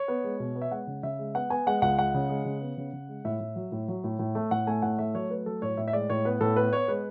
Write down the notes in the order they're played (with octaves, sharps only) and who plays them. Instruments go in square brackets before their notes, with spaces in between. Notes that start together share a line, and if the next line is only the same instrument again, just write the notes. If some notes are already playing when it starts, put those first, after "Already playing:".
Already playing: [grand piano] C#5
B3
G#3
B2
B3
E5
G#3 F#5
C#3
C#3 E5
G#3
B3 F#5
B3 G#5
G#3 F#5
C#2 F#5
G#3 F#5
C#3
G#3
C#3
B3
C#3
C#3
G#3
A2 E5
A2
F#3
A2
F#3
A2
A2
A3
A2 F#5
A3 G#5
A2 F#5
A3 E5
F#3 C#5
A3 B4
F#3 A4
A2 C#5
A2 E5
E5
G#3 D5
A2 C#5
B3 B4
A2 A4
B3 B4
B3 C#5
G#3 B4